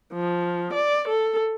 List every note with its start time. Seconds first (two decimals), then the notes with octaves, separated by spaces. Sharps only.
0.13 F3
0.73 D5
1.08 A4